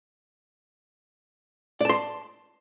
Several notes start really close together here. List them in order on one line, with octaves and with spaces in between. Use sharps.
D5 A5 C6